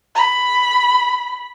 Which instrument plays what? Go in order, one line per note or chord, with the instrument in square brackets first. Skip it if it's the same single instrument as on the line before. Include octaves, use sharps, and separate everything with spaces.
[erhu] B5